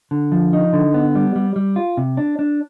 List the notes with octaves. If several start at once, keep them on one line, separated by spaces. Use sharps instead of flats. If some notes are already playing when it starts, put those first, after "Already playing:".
D3
F3
D#4
D3
B3
G3
G3
G3
F4
C3
D4
D4